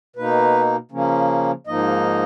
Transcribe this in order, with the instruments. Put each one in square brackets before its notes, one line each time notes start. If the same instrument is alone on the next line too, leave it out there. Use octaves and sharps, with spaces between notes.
[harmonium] B2 A#3 D#4 B4
C#3 F3 A#3 C#4
G#2 F3 A#3 D#4 D#5